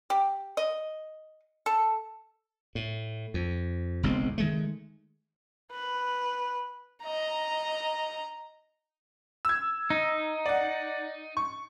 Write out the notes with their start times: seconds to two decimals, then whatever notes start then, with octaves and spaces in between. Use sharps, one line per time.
0.10 G4
0.57 D#5
1.66 A4
2.75 A2
3.34 F2
4.03 F#1 B1 G#3 C4
4.38 D#3 G#3 A3
5.72 B4
7.03 D#5 A#5
9.45 E6 G#6
9.90 D#4
10.46 D5 F#5
11.37 C#6